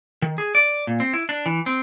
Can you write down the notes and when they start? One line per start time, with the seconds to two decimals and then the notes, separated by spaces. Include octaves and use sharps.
0.22 D#3
0.38 G#4
0.55 D5
0.87 A#2
1.00 C4
1.13 E4
1.29 D4
1.46 E3
1.66 C4